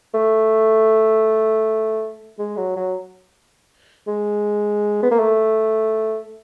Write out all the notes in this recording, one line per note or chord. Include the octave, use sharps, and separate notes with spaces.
A3
G#3
F#3
F#3
G#3
B3
A#3
A3